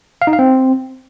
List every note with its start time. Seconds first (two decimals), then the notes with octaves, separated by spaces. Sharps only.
0.22 F5
0.27 D#4
0.33 F5
0.39 C4